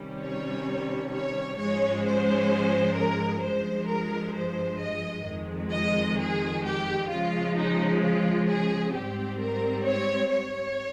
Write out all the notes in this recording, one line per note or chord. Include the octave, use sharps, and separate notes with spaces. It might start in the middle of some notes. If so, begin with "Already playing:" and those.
Already playing: C3 D#3 G3 C#4
C#5
C#5
G#2 F3 G#3 C#4 C#5
C5
A#4
G2 F3 G#3 C5
A#4
C5
D#5
F2 D#3 G#3
D#5
G#4
G4
C#3 F3 G#3 F4
D#4
F4
G#4
G#2 G3 C4 G4
A#4
C#5
C#5